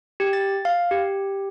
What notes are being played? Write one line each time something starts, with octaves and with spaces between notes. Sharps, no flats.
G4
A6
F5
G4